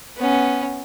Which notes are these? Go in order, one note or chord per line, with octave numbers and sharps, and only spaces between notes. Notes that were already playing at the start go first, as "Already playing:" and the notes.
B3 C#4